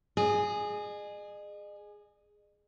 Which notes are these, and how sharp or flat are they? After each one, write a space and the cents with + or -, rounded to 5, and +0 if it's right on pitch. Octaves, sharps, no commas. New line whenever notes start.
G#4 +0 D#5 -40